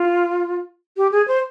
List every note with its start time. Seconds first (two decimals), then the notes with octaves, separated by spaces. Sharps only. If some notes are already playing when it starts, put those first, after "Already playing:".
Already playing: F4
0.97 G4
1.12 G#4
1.28 C5